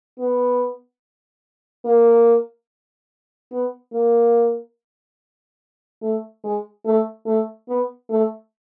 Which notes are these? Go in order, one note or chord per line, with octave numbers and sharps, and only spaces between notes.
B3
A#3
B3
A#3
A3
G#3
A3
A3
B3
A3